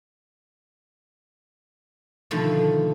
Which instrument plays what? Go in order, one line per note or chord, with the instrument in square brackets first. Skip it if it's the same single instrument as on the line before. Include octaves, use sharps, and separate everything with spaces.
[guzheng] B2 D3 D#3 F3 A3